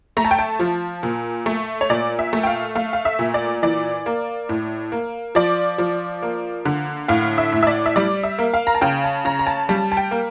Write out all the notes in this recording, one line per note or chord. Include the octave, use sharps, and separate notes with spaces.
A3 A#5
A5
G5
A5
F3
A#2
A3
C#5
A#2 D5
E5
A3
G5
F5
A3 F5
F5
E5
A#2
D5
E3 D5
A#3
A2
A#3
F3 D5
F3
A#3
D3
A2 F5
E5
A2
E5
D5
E5
G3 D5
E5
A#3
F5
A#5
A5
C#3 G5
A5
C#3 A#5
A#5
A5
G3 A5
A5
G5
A#3